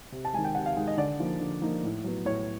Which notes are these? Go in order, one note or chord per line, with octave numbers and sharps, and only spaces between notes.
C3
A5
D#3 G#3 G#5
G5
C3 F#5
F5
D#3 G#3
D#5
D3 D5
F3 A#3 D#4
D3
F3 A#3 D#4
A2
F#3 B3
A2 C#5